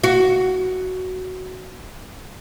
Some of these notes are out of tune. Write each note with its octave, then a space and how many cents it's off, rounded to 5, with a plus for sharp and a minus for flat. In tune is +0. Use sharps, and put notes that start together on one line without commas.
F#4 +5